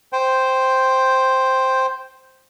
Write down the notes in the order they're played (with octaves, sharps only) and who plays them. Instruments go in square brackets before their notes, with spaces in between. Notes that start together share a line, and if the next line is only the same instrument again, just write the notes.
[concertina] C5 G5